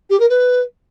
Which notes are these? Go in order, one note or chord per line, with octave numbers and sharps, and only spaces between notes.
G4
A#4
B4